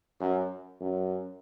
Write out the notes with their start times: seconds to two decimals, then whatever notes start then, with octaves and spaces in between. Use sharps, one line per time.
0.20 F#2
0.80 F#2